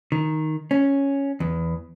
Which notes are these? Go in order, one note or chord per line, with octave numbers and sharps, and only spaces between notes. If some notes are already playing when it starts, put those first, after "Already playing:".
D#3
C#4
E2